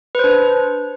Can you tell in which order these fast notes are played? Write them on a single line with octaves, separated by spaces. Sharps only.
B4 C5 D4